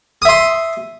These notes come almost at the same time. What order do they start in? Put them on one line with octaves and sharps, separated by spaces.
D#6 E5 C6